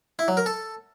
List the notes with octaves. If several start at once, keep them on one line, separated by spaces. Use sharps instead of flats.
E4
F#3
A#4
A4